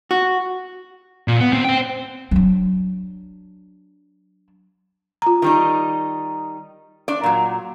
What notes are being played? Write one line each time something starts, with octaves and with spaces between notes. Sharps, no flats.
F#4
A#2
B3
D2 C4
C5 G5
F#3 D4
F4 A#5
D#3 G3 D#4
D4 D5
A#2 F#3